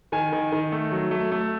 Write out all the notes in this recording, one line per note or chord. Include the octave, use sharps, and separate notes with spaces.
D#3 G#5
D#3
D#3
A3
F#3
A3
A3